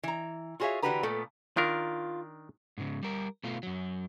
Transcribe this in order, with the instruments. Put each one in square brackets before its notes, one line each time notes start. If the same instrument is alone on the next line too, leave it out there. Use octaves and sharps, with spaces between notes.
[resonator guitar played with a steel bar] E3 A#5
F4 F#4 G#4 C#5 E5 F5
D3 E3 F#4 G4 B4 A#5
A#2 A3 B3 A4
[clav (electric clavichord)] D#3 D4 A#4 [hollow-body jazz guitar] F4
[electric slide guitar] G#2 C#3
G3 A#4
B2 A3 F4
F#2 F#3